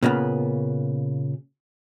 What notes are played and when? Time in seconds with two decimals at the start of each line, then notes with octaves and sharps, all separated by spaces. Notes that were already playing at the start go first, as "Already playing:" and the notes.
0.02 A#2 C#3 A#3 B3